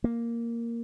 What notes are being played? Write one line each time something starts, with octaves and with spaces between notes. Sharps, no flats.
A#3